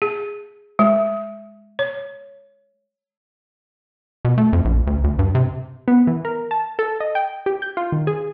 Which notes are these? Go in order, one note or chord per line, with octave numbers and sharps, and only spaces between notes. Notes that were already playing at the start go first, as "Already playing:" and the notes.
G#4
G#3
C#5
B2
A3
F2
A#1
D2
D2
G2
C3
B3
E3
A#4
A5
A4
D#5
G5
G4
G6
F4
D#3
G#4